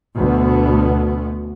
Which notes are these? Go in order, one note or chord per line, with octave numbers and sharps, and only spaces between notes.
D2 B2 B3